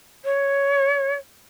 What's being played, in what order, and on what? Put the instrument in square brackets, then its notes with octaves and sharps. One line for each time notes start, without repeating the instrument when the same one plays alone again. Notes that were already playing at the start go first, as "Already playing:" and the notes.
[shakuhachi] C#5